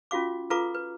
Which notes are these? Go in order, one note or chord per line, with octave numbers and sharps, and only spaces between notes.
C#4 F4 F#4 F5 D6
F4 A4 B4 F5 A#5 D6
B4